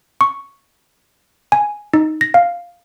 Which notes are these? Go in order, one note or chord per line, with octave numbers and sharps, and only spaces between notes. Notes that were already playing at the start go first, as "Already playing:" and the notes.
C#6
G#5
D#4
A#6
F5